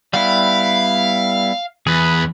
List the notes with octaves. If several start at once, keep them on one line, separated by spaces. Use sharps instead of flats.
G3 B3 E4 F5
E2 G#4 B4